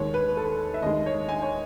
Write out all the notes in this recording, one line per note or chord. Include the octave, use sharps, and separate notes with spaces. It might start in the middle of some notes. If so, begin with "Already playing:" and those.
Already playing: D#2 D#3 G#3 C#5
B4
A4
E5
D#2 D#3 G#3 D#5
C#5
G#5
C#5